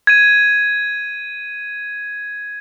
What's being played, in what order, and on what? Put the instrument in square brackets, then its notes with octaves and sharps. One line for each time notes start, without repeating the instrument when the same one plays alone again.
[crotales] G#6 D#7